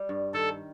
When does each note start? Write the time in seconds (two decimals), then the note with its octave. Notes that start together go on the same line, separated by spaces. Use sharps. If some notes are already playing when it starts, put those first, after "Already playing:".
Already playing: G3
0.09 G2
0.34 D#3 A4